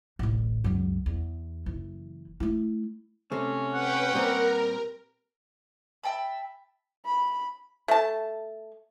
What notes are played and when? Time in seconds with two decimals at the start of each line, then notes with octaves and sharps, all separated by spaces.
0.19 D1 A1
0.64 C#2 F#2
1.06 E2
1.66 F#1 E3
2.40 A3 E4
3.32 C3 A3 C#4
3.74 B4 F#5 G5
4.13 A#2 G3 C4 A#4
6.03 E5 G5 A5 B5
7.05 B5
7.88 A3 A5